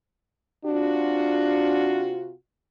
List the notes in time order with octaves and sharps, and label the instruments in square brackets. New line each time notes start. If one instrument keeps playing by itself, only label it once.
[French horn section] C3 F4 F#4 [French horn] D4